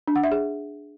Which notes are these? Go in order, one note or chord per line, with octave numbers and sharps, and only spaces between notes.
D4
F#5
E5
G#4